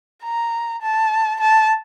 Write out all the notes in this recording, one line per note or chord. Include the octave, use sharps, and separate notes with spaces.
A#5
A5
A5